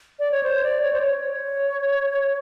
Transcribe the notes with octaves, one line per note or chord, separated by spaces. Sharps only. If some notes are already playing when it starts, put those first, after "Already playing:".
D5
C#5
C5
D5
C#5
C5
C#5